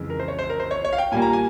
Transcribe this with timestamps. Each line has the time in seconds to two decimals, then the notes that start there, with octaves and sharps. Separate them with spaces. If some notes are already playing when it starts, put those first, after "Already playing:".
Already playing: F2 C#3 E3 G#3
0.10 A#4
0.19 C5
0.28 C#5
0.39 C5
0.50 A#4
0.60 C5
0.71 C#5
0.85 C#5
0.93 F5
0.98 G5
1.12 A#2 G3 A#3 G#5
1.22 A#5
1.33 G#5